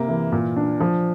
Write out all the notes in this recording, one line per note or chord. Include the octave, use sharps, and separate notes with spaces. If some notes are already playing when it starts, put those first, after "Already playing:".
Already playing: C3 A#3
E3
A#2
D4
F3